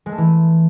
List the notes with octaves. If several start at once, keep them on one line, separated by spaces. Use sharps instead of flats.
G#3
A3
E3